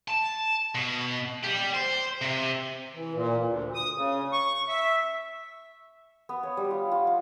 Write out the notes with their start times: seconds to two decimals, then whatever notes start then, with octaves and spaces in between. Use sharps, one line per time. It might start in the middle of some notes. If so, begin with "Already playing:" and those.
0.08 A5
0.75 B2
1.43 G3 G4
1.74 C5
2.21 C3
2.95 E3
3.14 A#2
3.46 D2
3.74 D#6
3.95 C#3
4.32 C#6
4.68 E5
6.29 B3
6.43 C#5
6.57 G3
6.71 F4
6.91 F4
7.07 F4